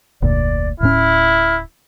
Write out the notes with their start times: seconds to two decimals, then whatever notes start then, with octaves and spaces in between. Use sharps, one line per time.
0.22 F1 D2 A#2 D5
0.80 D1 A2 C#4 E4 F6